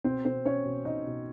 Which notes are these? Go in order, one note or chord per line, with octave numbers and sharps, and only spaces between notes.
B2 C4 C5
B2 C4 C5
B2 C#4 C#5
B2
B2 D#4 D#5
B2